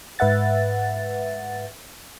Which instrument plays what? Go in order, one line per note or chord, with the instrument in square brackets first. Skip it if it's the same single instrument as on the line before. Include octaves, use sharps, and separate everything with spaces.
[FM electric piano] G#2 B4 E5 F#5 A6